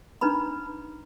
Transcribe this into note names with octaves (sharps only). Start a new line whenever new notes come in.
D4 D#4 B4 A#5 B5